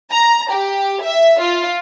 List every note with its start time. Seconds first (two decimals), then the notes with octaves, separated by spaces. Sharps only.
0.11 A#5
0.52 G4
1.03 E5
1.40 F4